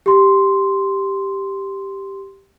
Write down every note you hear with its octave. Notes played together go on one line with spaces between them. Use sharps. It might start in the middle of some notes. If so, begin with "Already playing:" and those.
G4 C6